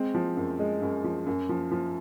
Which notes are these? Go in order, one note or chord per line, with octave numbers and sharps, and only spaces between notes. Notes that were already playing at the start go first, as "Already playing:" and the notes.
Already playing: G#3 C4
F3
F#2
G#3
F#2
F3
F#2
F3
F3